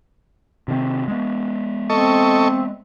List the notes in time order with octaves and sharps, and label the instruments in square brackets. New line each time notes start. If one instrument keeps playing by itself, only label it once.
[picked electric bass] C3 D#3 C4
G#3 B3
[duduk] C4 [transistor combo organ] A4 D#5 C#6